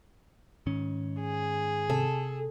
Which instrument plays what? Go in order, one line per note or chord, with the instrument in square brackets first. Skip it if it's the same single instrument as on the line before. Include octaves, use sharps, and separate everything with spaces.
[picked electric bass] G#2 D#3 C#4
[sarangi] G#4
[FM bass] C3 [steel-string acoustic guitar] A4